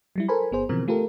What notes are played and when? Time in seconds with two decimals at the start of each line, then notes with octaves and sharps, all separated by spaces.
0.16 F#3 G3 E4
0.28 A4 A#4 C5 G#5 B5
0.52 G1 B3 G#4 C5
0.69 B2 D3 E3 F3 C4 A#4
0.88 A3 F4 G4 A4 A#4